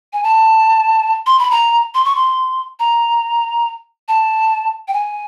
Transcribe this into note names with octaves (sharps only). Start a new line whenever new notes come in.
G#5
A5
C6
B5
A#5
C6
C#6
C6
A#5
A5
G5
G#5